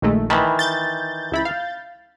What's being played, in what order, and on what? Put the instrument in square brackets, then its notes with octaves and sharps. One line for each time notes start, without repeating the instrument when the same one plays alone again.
[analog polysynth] A#1 A3 [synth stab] D#2 D#3 G#3
[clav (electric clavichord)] D#3 E3 [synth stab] A5 B5
[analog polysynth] G6 A6
[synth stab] C#2 E4 B5
F5